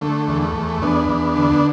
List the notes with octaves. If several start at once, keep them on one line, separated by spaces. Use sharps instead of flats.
D3 A3
E2
A3
E2
E2 B3 D4
E2
D3
B3